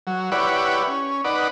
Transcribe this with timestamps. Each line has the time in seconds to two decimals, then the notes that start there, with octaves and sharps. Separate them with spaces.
0.07 F#3
0.32 E4 G4 B4 C#5 D5 F#5
0.87 C#4
1.25 D#4 B4 D5 F#5